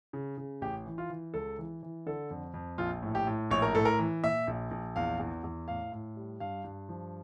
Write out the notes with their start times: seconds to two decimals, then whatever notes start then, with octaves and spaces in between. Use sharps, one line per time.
0.13 C#3
0.37 C#3
0.62 A1 G4
0.86 E3
0.98 F4
1.10 E3
1.34 C#2 A4
1.59 E3
1.83 E3
2.06 D3 A4
2.31 F2
2.54 F2
2.78 A#1 F4
3.03 A2
3.15 G4
3.27 A2
3.51 A#1 C#5
3.62 A#4
3.75 A2 A4
3.85 A#4
3.99 E3
4.23 A#2 E5
4.47 A#1
4.71 A#1
4.96 E2 F5
5.19 E2
5.44 E2
5.68 A2 F5
5.92 A2
6.16 G3
6.40 G2 F5
6.64 G2
6.89 F3